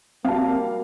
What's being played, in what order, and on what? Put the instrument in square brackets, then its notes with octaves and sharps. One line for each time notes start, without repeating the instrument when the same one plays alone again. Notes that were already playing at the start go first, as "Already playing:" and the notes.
[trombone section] G3 A#3 [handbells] C4 A5 [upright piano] F#4 F5